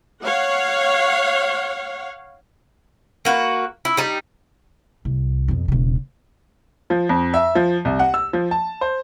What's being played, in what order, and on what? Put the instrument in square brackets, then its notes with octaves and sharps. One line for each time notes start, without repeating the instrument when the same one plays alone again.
[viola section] C#5 F5 F#5
[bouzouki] A#3 F#4 B4
E4
G3 D#4
[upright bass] C2
F2 B2
E1 C#3
[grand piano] F3
F2
E5
F3
C2
F#5
E6
F3
A5
C5